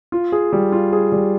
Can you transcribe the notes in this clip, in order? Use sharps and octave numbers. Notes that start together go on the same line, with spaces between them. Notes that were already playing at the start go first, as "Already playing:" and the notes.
F4
G#4
G3
F4
G#4
G3